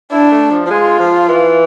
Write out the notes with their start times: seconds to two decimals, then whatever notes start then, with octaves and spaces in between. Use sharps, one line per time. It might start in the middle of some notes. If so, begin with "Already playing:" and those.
0.12 D4 E4
0.31 A3
0.51 F3
0.66 F3
0.70 G#3 F4
1.00 F3
1.29 E3